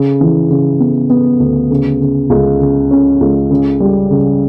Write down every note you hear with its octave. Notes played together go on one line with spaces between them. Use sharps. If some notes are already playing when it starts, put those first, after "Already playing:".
Already playing: C#3
E3
C#3
B3
B3
D2
C#3
C#3
C#2
C#3
C#4
C#2
C#3
G3
C#3